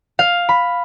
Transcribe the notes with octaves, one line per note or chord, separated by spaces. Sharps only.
F5
B5